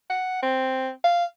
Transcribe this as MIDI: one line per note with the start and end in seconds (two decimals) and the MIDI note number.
0.09 0.38 78
0.42 0.90 60
1.04 1.24 77